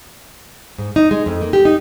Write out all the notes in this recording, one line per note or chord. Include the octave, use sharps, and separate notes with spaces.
G#2
D#4
G#3
F2
A#3
G4
D#4